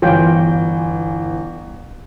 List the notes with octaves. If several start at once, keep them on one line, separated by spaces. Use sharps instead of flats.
G1 E3 F4 C#5 G5